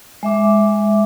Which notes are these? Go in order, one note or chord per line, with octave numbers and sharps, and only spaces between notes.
G#3 E5 D6